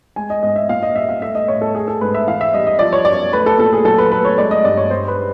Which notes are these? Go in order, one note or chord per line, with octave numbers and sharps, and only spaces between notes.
G#3 G#5
D#5
G#2 D#5
E5
A#2 F5
D#5
G3 E5
F5
A3 E5
D#5
A2 C#5
A4
A3 G#4
A4
G#2 B4
E5
E3 F5
E5
G3 D#5
D#5
F3 D5
C#5
F#2 D5
A3 B4
A4
A#2 A4
G#4
F#3 A4
B4
A3 B4
C#5
G#3 D5
D#5
G2 D5
C#5
G3 C5
B4